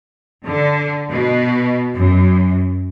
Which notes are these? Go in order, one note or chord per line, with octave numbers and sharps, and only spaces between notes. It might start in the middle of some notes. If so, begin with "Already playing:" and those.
D3
B2
F#2